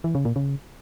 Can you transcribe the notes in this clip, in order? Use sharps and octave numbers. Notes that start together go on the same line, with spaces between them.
E3
C#3
A#2
C#3